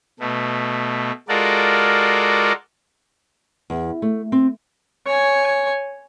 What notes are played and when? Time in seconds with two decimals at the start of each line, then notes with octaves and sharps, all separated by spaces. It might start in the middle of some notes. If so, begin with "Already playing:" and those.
0.20 B2 A3
1.29 G#3 F4 F#4 A4 A#4 D5
3.70 E2
4.02 A3
4.32 C4
5.06 C#5 G#5